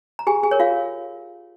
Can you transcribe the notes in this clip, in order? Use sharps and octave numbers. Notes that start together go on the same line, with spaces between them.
A#5
G4 G#4 G#5
G#4 G#5
A#4 C#5
F4 F5